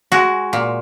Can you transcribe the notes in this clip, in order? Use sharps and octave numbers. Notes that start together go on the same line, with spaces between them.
G#3 F#4
A#2